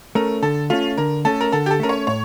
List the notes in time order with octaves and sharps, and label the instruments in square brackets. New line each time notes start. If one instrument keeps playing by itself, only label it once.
[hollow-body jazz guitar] A3 C#4 [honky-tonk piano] A#4
[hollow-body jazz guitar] D3 [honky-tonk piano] A4
[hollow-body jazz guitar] A3 C#4 [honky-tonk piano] F4
[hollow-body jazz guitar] D3 [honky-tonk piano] A#4
[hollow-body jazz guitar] A3 C#4 [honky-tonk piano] A4
[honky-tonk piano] A#4
[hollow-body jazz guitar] D3 [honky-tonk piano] A4
[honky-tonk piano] G4
A4
[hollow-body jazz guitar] A3 C#4 [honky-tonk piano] A#4
[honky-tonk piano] C#5
[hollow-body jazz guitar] A2 [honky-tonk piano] C#5